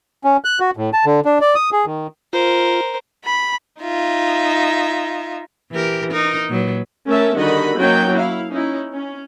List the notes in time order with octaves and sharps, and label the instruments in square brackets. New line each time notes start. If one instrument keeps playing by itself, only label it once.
[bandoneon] C#4
F#6
F#4
A2
A5
D3
D4
D5
D#6
G#4
D#3
[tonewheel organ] F4 [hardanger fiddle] A#4 C5
[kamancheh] B5
[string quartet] D#4 F4 E5
[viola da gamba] E3 G4 A#4
D#4 A#4
A#2 F#3 B4
[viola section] A3 C#4 A#4 E5 A5
D3 D#3 G3 F#4 D#5 B5
F#3 A#3 C#4 D#4 G5
E4 F5
C#4 D#4 E4
C#4